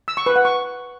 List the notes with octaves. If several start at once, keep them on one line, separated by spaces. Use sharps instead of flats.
E6
C#6
B4
F#5
C#6